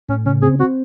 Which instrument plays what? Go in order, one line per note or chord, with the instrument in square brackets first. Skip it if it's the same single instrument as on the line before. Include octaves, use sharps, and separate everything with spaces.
[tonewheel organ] A2 [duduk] C#4
[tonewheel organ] C#3 [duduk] C#4
[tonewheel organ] C4 [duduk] G#4
[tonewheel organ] C4 [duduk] F#4